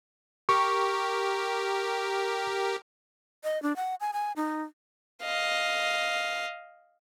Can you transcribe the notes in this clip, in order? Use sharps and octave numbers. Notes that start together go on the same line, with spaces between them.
G4 A#4 C#6
D#5
D4
F#5
G#5
G#5
D#4
D#5 F5